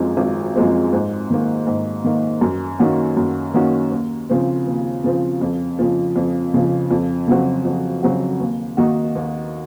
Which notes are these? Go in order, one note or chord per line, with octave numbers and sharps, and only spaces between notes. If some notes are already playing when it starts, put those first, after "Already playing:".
Already playing: G#1 F#2 F3 G#3 C4
G#1
F#2 F3 G#3 C4
G#2
D#3 A#3
G#2
D#3 A#3
F#2
D#3 A#3 C#4 F#4
F#2
D#3 A#3 C#4 F#4
D#2
C#3 F3 C4
D#2
C#3 F3 C4
F2
C#3 F3
F2
C#3 F3
F2
C#3 F#3 C4 F#4
F2
C#3 F#3 C4 F#4
D#2
D#3 A#3 D#4 F#4
D#2